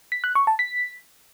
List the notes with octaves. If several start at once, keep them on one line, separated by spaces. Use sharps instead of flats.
B6
F#6
C#6
A5
B6